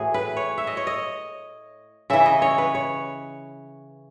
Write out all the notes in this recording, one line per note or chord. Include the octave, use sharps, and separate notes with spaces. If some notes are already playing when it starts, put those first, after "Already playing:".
Already playing: A2 E3 F#4 G#4
B4
C#5
E5
D#5
C#5
D#5
C#3 E3 E5
D#5
C#5
B4
C#5